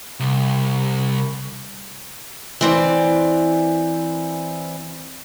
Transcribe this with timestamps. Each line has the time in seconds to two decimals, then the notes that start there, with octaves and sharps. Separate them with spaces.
0.20 C2
2.61 E3 C4 D5